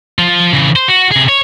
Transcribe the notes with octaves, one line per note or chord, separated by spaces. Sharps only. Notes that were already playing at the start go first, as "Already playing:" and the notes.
F3 F4
C#3 E3
C5
F#4
C3 G#4
C#5